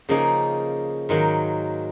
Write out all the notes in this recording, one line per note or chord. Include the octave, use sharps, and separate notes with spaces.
C#3 F3 A#3 D#4 G#4
G#2 D#3 F#3 A#3